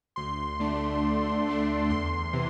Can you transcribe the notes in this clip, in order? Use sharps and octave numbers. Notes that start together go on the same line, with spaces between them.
D2 C6
D3 A3 D4
D2
D3 A3 D4
E2 C6
C3 E3